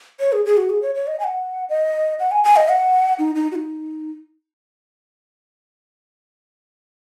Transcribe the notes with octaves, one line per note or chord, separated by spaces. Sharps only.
C#5
G#4
G#4
F#4
G#4
C#5
C#5
D#5
G#5
F#5
D#5
F#5
G#5
G#5
D#5
F#5
D#4
D#4
F#4
D#4